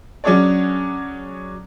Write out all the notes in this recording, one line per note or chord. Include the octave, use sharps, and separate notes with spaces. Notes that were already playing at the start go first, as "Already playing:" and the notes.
F#3 C#4 D4 G#4 C#5 D5